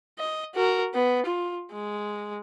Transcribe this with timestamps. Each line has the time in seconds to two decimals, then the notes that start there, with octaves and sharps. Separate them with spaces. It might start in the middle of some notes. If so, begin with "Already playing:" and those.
0.19 D#5
0.55 F#4 A#4
0.94 B3
1.26 F4
1.72 G#3